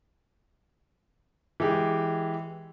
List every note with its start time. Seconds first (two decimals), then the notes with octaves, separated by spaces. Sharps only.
1.60 E3 G#3 G4 G#4